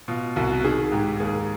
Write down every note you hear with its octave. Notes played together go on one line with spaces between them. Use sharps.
B2 F4
C2 F#4
D#3 G#4
G#2 G4
D#2 G#4